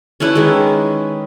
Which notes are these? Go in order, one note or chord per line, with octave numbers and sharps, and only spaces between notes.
C#4 D4 E4 B4
D#3 G#3